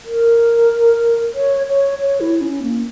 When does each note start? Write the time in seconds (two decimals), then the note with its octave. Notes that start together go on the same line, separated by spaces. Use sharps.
0.05 A#4
1.34 C#5
1.67 C#5
1.99 C#5
2.20 E4
2.41 C#4
2.63 A#3